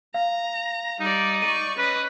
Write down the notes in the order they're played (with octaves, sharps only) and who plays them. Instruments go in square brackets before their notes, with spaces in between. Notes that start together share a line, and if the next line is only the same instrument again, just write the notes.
[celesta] F5 [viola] A#5
[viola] G3 D5 [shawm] D#4
[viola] D5 C#6 [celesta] D#7
[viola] C#4 D#5 [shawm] B4